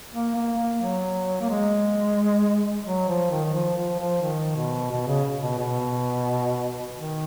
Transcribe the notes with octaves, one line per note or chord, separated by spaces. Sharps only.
A#3
A#3
A#3
F#3
A#3
G#3
F#3
F3
D#3
D#3
F3
F3
F3
D#3
B2
B2
C#3
B2
B2
D#3